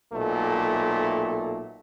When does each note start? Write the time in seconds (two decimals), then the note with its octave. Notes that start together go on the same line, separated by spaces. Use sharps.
0.13 B1 A#2 A3